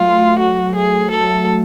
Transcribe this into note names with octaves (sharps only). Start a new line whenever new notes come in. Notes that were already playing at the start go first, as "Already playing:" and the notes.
Already playing: F#3 A3 F4
F#4
G#4
F#3 A3 A4
F#3 A3
F#3 A3
F#3 A3